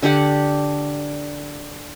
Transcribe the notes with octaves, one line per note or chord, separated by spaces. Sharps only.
D3 D4 G4 F#5